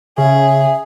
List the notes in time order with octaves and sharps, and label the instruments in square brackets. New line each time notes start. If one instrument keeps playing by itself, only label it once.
[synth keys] C#3 [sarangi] G#4 [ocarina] E5